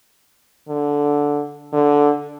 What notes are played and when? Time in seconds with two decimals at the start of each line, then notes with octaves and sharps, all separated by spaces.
0.69 D3
1.73 D3